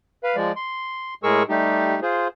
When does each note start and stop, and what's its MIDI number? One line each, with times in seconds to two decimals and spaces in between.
0.24 0.36 71
0.24 0.36 77
0.36 0.52 53
0.36 0.52 56
0.36 0.52 74
0.56 1.14 84
1.24 1.43 45
1.24 1.43 56
1.24 1.43 68
1.24 1.43 70
1.24 1.43 85
1.24 1.43 88
1.49 2.00 55
1.49 2.00 57
1.49 2.00 63
1.49 2.00 67
2.02 2.28 65
2.02 2.28 68
2.02 2.28 72